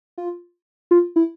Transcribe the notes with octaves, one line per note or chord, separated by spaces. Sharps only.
F4
F4
E4